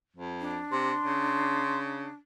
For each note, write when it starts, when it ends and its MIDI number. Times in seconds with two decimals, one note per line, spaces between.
0.16 0.58 41
0.40 2.16 62
0.72 0.92 48
0.72 1.79 84
1.04 2.07 49